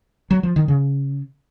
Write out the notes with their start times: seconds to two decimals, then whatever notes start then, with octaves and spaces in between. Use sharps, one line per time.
0.31 F#3
0.43 F3
0.56 D#3
0.68 C#3